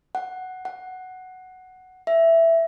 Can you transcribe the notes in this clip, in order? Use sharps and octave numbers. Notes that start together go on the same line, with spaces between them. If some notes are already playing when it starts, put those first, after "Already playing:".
F#5
F#5
E5